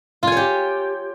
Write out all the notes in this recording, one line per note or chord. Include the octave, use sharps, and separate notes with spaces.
F4 G4 C#5 G#5